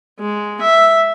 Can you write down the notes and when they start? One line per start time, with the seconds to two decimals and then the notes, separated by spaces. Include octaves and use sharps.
0.20 G#3
0.61 E5